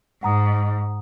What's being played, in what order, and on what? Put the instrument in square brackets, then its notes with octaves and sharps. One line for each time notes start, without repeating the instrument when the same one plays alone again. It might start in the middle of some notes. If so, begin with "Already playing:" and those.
[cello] G#2 [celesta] F#5 A#5 D#6